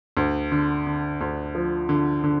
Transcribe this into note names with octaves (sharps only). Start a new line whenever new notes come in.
D2
D3
D3
D2
F3
D3
D3